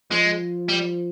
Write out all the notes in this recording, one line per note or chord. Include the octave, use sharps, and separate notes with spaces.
F3 G#3
G3